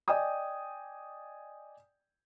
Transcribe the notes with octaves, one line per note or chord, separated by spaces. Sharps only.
D5 D#5 G5 G#5 D#6